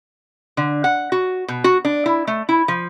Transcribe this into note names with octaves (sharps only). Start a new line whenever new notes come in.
D3
F#5
F#4
B2
F#4
D4
E4
A3
E4
F3